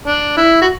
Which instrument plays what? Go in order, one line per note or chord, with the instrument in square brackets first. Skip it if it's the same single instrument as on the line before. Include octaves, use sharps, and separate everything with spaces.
[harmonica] D4
E4
F#4